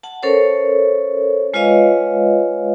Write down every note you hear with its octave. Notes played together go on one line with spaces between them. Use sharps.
F#5 A5
C#4 A4 A#4 C5 C#5
G#3 F4 B4 C#5 D#5 F5